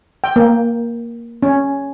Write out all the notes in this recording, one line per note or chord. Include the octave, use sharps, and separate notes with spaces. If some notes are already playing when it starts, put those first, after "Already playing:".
G5
A#3
C#4